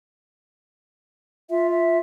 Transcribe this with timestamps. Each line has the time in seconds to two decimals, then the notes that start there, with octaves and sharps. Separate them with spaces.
1.50 F4 E5
1.70 E5